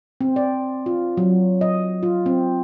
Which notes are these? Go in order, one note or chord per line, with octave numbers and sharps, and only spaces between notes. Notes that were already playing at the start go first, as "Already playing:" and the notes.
C4
D5
F4
F#3
D#5
F4
C4